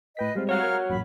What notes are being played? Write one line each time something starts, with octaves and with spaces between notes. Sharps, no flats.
A2 B4 D#5 G5 B6
G3 G#3 C4 F4
F#4 C#5 F5 A#5 F6
A#4 G#6
A1 F#2 A#2 B5